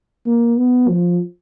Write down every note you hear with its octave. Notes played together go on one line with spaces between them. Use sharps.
A#3
B3
F3